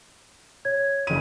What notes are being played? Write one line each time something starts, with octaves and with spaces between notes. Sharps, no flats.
C#5 G#6
F#1 D#7